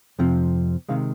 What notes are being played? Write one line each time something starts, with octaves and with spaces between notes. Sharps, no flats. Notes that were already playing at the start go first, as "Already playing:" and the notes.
F2 C3 F3 C4
C3 D#3 G#3 F5